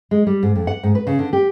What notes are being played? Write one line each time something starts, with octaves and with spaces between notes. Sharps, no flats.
G#3
G3
G#2
F2
F#5
G#2
B4
C#3
D3
G4